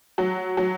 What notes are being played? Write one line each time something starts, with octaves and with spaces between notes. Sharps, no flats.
F#3
F#3